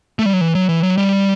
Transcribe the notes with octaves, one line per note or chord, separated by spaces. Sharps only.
A3
G3
F#3
E3
F#3
E3
F#3
G3